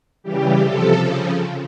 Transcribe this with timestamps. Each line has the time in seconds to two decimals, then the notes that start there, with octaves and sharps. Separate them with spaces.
0.23 C#3 E3 G3 G4
0.62 C3 F3 A4
1.00 C#3 F3